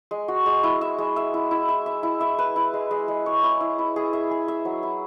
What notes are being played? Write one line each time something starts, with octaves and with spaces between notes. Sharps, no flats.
G#3
F#4
G#3
E4
E5
G#3
E5
E4
E4
E5
E5
E4
E5
B4
E4
G#3
G#3
G#3
C#5
E4
E4
E4
G#4
E5
G#4
E5
F#3
E4